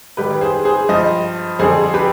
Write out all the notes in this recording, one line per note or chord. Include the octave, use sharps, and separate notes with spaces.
G#2 D#3 G3 G4 B4
G#4 C5
G#4 C5
G2 F3 C5 D#5
F2 D3 G3 G#4 C5
G4 B4